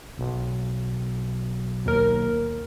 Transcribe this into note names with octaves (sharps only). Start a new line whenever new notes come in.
B1
D#2 A#4